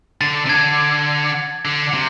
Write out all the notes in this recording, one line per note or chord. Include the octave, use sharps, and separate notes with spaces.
D3 A6
C3
D3 G#6
D3
C3